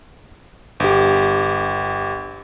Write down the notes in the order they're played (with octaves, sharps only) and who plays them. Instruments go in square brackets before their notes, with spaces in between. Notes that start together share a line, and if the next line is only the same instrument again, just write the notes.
[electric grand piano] G1 G4